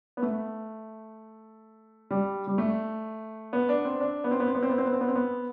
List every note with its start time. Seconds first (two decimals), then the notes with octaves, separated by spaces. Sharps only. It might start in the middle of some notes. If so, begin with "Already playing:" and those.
0.17 B3
0.22 A3
2.11 G3
2.47 G3
2.58 A3
3.53 B3
3.69 D4
3.85 C4
4.01 D4
4.24 B3
4.31 C4
4.40 B3
4.48 C4
4.55 B3
4.63 C4
4.69 B3
4.78 C4
4.85 B3
4.92 C4
5.01 B3
5.09 C4
5.15 B3